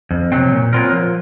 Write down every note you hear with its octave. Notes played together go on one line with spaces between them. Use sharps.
F2
C3 D#3 F#3 C4
A#2
F#3 C4 F4 A#4
F3